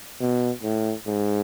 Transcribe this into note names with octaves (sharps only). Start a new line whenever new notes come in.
B2
A2
G#2